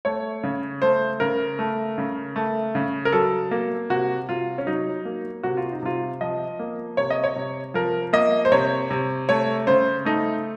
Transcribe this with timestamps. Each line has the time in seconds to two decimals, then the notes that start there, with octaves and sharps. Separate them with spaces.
0.05 A3 C#5
0.43 C#3
0.82 A3 C5
1.20 C#3 A#4
1.59 A3
1.98 C#3
2.36 A3
2.75 C#3
3.05 A#4
3.13 F#3 A4
3.51 A#3
3.90 C3 F#4
4.29 C3 F4
4.58 C#4
4.67 F#3 D#4
5.05 A#3
5.43 C3 F#4
5.57 F4
5.72 D#4
5.82 C3 F4
6.21 F3 D#5
6.59 A#3
6.97 C3 C#5
7.10 D#5
7.24 C#5
7.36 C3
7.74 F3 A#4
8.13 A#3 D#5
8.45 C5
8.52 C3 C#5
8.90 C3
9.29 A3 C#5
9.67 C#3 C5
10.05 A3 D#4